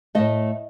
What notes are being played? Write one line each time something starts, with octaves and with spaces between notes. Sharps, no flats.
A2 F#3 A3 D#5